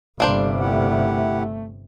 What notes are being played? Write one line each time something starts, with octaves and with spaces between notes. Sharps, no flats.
G1 C3 G3 A#3 D4 C5
A3 E4 G4 F#5